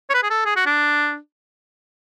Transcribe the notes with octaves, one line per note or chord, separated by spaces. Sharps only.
C#5
B4
G#4
A4
G#4
F#4
D4